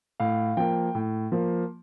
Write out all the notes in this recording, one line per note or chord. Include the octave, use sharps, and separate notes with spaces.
A2 F5
F3 A#3 G5
A2
F3 A#3